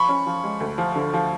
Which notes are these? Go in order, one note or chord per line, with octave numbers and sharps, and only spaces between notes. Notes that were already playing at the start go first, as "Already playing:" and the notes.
Already playing: F3 B5 C#6
C#4
F3
G#3
D2
F3
D3
F3